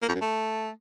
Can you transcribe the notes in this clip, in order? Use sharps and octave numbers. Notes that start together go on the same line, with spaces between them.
A#3
F2
F#2
A3